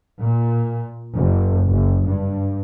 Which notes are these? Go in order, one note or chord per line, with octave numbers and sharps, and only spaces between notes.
A#2
F#1
F#1
G2